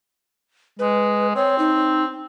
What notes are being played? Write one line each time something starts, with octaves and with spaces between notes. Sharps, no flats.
G#3 B4
C4 C#5
D#4